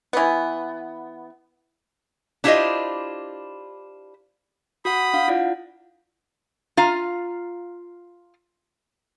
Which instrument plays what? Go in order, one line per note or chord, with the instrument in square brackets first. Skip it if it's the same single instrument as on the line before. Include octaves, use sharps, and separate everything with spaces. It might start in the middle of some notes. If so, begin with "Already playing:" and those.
[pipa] E3 B3
[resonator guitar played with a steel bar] D4 E4 F4 G4 C5 D#5
[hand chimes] F#4 F#5 [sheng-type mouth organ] B5 D#6
[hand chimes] D4 F5 F#5
E4 F4 D5
[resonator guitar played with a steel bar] F4 F5 A#5